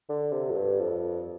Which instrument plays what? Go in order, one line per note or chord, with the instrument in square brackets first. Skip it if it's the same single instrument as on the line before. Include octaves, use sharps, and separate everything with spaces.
[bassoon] D3
C3
F2
G2
F2